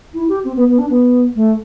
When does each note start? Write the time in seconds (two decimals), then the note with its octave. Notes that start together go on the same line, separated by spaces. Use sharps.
0.14 E4
0.28 G4
0.44 C4
0.56 B3
0.67 B3
0.78 D4
0.90 B3
1.35 A3